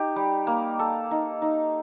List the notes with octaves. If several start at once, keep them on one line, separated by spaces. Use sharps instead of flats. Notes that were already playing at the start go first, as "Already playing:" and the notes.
Already playing: D#4 G4
G3
A#3
A4
D#4
D#4